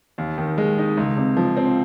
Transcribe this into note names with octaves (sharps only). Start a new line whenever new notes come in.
D#2
D#3
G#3
D#4
C#2
C3
F3
C4